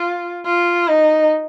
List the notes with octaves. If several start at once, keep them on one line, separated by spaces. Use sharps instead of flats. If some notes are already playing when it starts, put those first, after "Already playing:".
Already playing: F4
F4
D#4